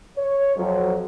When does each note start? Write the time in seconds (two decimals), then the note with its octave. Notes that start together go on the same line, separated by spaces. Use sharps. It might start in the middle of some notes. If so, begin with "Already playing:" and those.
0.18 C#5
0.56 F2 F#3